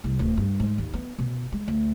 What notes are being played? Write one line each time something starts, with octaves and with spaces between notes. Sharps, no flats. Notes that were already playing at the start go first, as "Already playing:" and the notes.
C2
D1
G2
G#2
D#2
B3
B2
G#3
D2